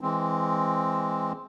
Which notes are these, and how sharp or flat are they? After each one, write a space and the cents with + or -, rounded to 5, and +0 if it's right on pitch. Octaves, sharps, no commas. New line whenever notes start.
E3 -10 G#3 +0 C4 +5